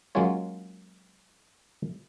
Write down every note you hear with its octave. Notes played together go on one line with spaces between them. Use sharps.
F#3 G#3 A#3 C#4 F4 C#5